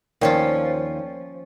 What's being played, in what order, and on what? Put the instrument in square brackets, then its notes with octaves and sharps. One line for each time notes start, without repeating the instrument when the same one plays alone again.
[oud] D#2 [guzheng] F3 C#4 F4 [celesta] A#4 D5 G5